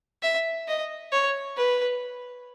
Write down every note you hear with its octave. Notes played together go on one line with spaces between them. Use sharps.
E5
D#5
C#5
B4